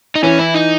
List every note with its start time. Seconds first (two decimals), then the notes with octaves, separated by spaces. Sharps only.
0.15 D#4
0.23 E3 C#4
0.39 E4
0.55 D#4